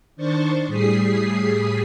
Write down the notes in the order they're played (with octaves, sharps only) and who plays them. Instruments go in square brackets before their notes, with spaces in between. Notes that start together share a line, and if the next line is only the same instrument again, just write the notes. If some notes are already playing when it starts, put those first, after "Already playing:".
[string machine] D#3 D4 C5 C#6 A6
A2 G3 G#4 D#6 B6 C7